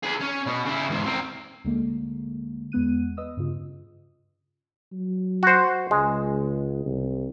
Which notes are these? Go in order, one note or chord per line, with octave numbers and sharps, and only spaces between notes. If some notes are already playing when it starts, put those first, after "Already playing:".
G#4 B4
C#4
B2 B3
C#3 E4
E2 G#2
C4 A#4
D2 D3 G#3 A#3
E2 G#3 B3 F#6 D#7
B4 D#5 D#6 E6
G2 C#3 F4
F#3
F#4 C5
C#2 G#3
C2